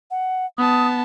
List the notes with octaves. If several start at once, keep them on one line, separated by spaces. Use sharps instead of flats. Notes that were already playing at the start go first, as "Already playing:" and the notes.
F#5
B3 A5 D#6